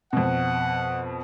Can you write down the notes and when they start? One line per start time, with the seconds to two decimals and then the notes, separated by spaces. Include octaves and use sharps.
0.13 F2 B2 F#5